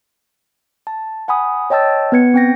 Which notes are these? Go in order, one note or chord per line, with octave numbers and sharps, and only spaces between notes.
A5
F#5 G#5 B5 D#6
C#5 D#5 G5 A5 E6 A6
B3 B4 G#6 C#7
C4 G5 A#6